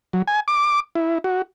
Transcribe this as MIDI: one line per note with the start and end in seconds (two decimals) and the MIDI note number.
0.13 0.22 54
0.28 0.40 80
0.48 0.80 86
0.95 1.18 64
1.24 1.42 66